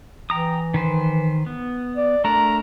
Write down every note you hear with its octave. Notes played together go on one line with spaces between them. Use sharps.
E3 G5 A#5 D#6
D#3 B4 C5
B3
D5
A3 D4 A#4 A#5